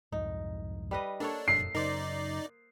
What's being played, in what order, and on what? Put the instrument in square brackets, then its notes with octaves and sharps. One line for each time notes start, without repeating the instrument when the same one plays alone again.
[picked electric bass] C2 F2 G#2 [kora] D#4
[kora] G3 B4 D#5
[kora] A#3 A4 C#5 [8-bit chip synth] D4
[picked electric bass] F1 F#2 A#2 [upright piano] C7
[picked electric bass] F#2 C#3 [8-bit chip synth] D#4 D5 [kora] A#4 C5